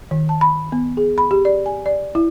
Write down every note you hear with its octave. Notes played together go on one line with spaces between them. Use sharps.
D#3
A5
B5
B3
G#4
B5
G4
D5
G#5
D5
E4